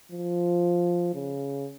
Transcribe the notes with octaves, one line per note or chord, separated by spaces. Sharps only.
F3
C#3